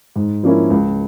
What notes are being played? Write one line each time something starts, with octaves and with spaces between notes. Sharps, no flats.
G#2
F3 A#3 C#4 E4
C#2